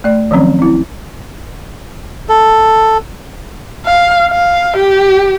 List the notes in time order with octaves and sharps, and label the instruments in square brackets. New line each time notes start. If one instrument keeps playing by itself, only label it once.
[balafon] A3 D5
D#3 F3 F#3 C4 C#4
C4 E4
[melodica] A4
[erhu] F5
F5
G4